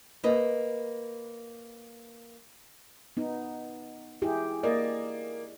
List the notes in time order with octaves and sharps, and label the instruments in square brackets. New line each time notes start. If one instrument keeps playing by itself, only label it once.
[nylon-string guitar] A#3 B4 D#5
[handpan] B3 D#4
E4 G4 G#4
[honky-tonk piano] A#3 [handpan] D5 D#5